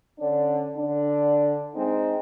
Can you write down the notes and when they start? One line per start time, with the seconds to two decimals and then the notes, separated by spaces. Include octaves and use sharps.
0.20 D3 C#4 D4
0.77 D3 D4
1.75 G#3 C4 D#4